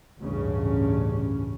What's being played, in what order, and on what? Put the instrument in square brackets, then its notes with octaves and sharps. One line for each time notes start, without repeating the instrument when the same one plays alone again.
[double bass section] A1 D2 G2 C#3 C#4